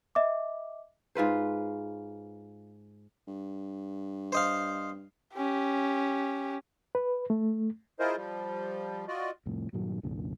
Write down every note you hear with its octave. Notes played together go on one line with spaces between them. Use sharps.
D#5 E5 D6
G#2 F4 B4 C5
G2
C5 D#5 F5
C#4 G4
B4
A3
E4 F4 G#4 A#4 C5 D#5
F3 G3
F4 F#4 D5 D#5
C2 F2 A2
G2 A#2 D#3 F#3
C2 F#2 A#2 D3